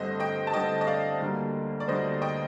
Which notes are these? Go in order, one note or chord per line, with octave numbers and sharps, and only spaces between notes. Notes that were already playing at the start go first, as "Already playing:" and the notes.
Already playing: G2 D3 A3 C4 C5 D#5
D#5 G5
A5
G2 D3 A3 C4 D#5 G5
D#5
D5 F5
D2 D3 G3 A#3
D5
D2 D3 G3 A#3 C5 D#5
D#5 G5